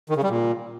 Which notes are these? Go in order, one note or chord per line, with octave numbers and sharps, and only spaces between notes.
D#3
C#3
G3
A#2